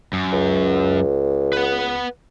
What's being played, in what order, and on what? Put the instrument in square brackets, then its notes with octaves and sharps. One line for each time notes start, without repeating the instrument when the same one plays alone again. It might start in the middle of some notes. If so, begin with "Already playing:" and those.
[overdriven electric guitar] F#2
[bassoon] C#2
[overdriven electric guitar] B4 F#5